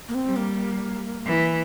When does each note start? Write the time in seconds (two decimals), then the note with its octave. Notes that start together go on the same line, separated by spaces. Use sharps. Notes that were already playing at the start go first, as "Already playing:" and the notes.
0.08 A#3
0.14 C4
0.26 G3
0.37 A#3
1.26 E3